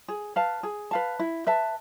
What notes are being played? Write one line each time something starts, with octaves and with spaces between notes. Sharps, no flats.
G#4
B4 F5 A5
G#4
B4 F5 A5
E4
B4 E5 A5